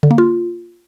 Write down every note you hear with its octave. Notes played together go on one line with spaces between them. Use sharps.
D3
A#3
F4